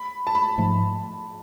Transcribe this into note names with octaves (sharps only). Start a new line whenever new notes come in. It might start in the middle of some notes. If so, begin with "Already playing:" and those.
Already playing: B5
A5
B5
G#2 F3 A3